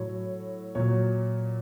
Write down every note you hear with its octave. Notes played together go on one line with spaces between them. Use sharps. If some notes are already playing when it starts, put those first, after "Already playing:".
Already playing: A2 F#3 C#5
A#2 F#3 C#5